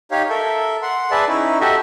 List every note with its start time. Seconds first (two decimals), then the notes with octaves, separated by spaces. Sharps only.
0.11 D#4 G4 C#5 F5
0.29 A4 A#4 E5
0.82 F#5 C6
1.11 G#4 B4 D5 E5 A5
1.28 C#4 D#4 E4
1.61 F#4 G4 A4 D#5 E5